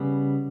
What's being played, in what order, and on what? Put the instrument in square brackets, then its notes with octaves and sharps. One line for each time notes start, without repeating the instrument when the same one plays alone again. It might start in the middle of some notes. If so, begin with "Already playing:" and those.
Already playing: [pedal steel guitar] C#3 G3 B3